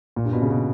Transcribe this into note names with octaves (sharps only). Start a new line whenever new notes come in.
A#2
G2
B2
C#3
B2